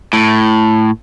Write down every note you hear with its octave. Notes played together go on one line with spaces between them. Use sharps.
A2